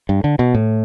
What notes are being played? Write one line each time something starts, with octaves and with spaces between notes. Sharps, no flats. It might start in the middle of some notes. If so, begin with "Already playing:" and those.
G2
D3
B2
A2